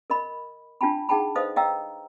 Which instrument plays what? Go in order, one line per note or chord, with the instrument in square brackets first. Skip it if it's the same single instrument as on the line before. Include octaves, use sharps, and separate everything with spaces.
[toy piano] A#4 D#5 B5
D4 F4 G5 A5 B5
D#4 G#4 F#5 G5 A5 B5
A4 B4 C5 D#5 F5 D#6
D#5 F5 G5 A#5 E6